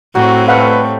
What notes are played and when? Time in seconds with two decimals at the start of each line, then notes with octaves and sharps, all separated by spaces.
0.15 A2 F#3 C4 F#4 G4 C#5
0.48 G3 A3 B4 F5 F#5